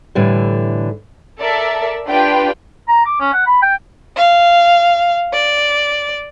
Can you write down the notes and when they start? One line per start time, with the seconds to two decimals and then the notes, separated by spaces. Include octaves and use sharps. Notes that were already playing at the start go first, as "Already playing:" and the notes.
0.15 A2 D3 E3 G3
1.39 A4 A#4 D5 E5
2.07 D4 F4 G4 B4 G5
2.89 A#5
3.06 D6
3.20 C#4
3.34 F#5
3.46 B5
3.62 G5
4.17 F5
5.34 D5